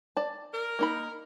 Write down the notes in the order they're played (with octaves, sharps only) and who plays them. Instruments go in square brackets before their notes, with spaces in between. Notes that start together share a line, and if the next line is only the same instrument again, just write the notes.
[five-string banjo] D5 A5
[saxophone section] A#4
[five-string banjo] A#3 D#4 B5